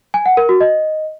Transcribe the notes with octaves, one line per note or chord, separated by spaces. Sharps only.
G#5
F#5
A#4
F#4
D#5